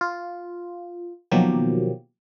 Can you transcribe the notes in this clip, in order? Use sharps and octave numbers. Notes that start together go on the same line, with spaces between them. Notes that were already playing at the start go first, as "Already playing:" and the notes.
F4
B2 D#3 F3 F#3 A#3 G4